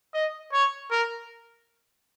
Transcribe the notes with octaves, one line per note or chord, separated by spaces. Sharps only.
D#5
C#5
A#4